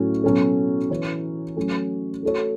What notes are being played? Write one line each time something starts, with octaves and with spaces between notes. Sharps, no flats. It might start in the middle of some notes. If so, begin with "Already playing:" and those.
Already playing: A2 F#3 A3 C#4
B2 F#3 C#4 F#4 A4
E3 C#4 E4 C#5
F#3 A3 C#4
A3 F#4 A4 C#5